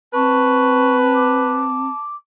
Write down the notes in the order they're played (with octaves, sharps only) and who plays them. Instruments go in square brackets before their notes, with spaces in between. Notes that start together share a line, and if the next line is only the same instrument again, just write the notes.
[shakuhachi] C4 [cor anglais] B4 [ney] A5 [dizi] C#6
[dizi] D6